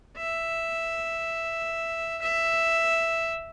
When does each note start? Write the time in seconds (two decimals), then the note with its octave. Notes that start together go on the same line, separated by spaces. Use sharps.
0.17 E5
2.22 E5